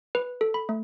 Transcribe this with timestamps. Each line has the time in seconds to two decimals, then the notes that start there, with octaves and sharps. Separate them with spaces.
0.15 B4
0.41 A4
0.54 B5
0.69 A3